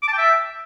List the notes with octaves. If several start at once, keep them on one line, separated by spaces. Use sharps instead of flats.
D6
A5
G5
E5